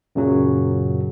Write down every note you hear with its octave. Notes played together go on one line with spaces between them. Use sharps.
F#2 A#2 C#3 F#3